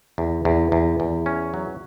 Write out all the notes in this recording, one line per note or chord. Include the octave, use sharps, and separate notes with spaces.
E2
E2
E2
E2
C#4
F#3